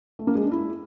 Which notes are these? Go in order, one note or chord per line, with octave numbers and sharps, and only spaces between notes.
A3
A#3
G#3
D4
E4